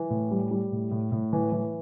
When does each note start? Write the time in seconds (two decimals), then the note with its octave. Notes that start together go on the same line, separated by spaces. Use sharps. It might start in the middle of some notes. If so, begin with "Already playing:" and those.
Already playing: E3
0.10 A2
0.31 G3
0.51 G3
0.72 A2
0.91 A2
1.12 A2
1.33 E3
1.52 E3